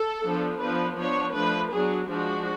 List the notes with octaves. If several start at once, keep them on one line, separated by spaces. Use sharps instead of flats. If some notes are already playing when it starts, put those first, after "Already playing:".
Already playing: A4
F3 B3 D4
F3 B3 D4 B4
F3 B3 D4 C#5
F3 A3 D4 B4
F#3 B3 D4 G#4
F3 G#3 D4 F#4